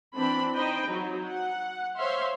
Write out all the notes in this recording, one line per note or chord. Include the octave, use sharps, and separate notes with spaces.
E3 C4 D4 B5
D#4 C5 D#5 G5 B5
F#3 D#4 F#4
F#5
C5 C#5 E5 F5 C6